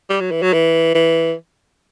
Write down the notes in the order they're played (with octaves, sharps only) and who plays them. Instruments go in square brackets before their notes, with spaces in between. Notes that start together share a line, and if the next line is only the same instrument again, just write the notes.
[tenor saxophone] G3
F#3
E3
F#3
E3
E3